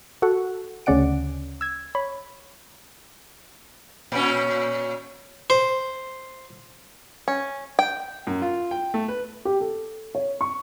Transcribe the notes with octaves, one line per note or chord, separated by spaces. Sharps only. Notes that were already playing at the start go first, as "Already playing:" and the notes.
F#4 A4 F#5
D2 C#3 C#4 D5 F#5 D7
E6 G#6
C#5 B5
A#2 C#4
C5
C#4
G5
F#2
F4
G5
A3
B4
G4
A4
C#5
C#6